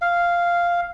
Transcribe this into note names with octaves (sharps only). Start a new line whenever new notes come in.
F5